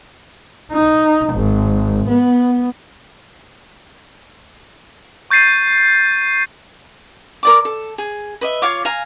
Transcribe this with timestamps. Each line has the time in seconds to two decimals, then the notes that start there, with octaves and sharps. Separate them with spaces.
0.72 D#4
1.33 G#1
2.08 B3
5.30 C#6 G6 A6 C7 D#7
7.43 A#4 D5 D6
7.65 A4
7.98 G#4
8.41 B4 D#5 E5
8.62 F4 C#5 F5 D6
8.85 F5 G#5 A#5